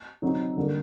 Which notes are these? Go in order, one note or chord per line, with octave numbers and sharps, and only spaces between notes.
C3 F#3 C4 D#4
D3 G3 A#3